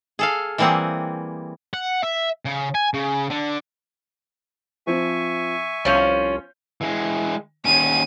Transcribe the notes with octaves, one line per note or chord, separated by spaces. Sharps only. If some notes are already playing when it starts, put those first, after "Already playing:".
G#4 A4 F5
E3 G3 A#3 C4 G#4 F#5
F#5
E5
C#3
G#5
C#3
D3
F3 C4 E5 G#5 C#6
C2 F3 C#4 C#5 F5 G6
E3 G#3
D#2 C#4 D#7